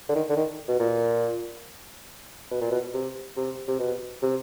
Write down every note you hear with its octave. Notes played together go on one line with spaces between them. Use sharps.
D3
D#3
D3
D#3
B2
A#2
B2
A#2
B2
C3
C3
C3
B2
C3